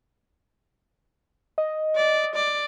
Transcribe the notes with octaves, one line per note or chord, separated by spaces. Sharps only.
D#5
D5
D5